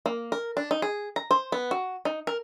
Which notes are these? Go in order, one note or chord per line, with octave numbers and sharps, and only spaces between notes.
A#3
A#4
D4
D#4
G#4
A#5
C5
B3
F#4
D#4
A#4